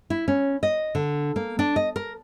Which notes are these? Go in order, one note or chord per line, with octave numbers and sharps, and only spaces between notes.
E4
C#4
D#5
D3
A#3
D4
D#5
A#4